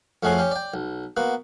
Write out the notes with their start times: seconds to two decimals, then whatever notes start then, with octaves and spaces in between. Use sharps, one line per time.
0.23 F2 A3 C#4 F#4 G#4 C6
0.39 C#4 G4
0.51 D5 G5
0.74 B1
1.17 A#3 B3 F#4